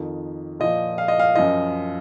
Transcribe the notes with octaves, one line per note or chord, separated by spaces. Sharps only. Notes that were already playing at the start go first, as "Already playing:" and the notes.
Already playing: F2 D#3
A#2 F3 D#5
F5
D#5
F5
F#2 F3 D#5